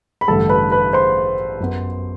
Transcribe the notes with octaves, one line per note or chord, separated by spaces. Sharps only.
B5
A1 G2 D3 A3 A4 A5
B4 B5
B4 B5
C5 C6
F#2 F#3 B3